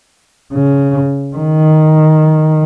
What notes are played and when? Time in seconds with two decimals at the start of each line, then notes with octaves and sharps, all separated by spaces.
0.54 C#3
1.35 D#3